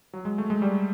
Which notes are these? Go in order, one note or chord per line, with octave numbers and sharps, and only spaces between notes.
F#3
G#3
A3
G#3
G3